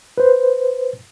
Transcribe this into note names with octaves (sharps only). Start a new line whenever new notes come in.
B4 C5